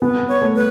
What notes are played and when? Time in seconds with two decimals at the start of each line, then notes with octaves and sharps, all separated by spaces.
0.01 B3 B4
0.28 C#5
0.42 A3
0.55 B4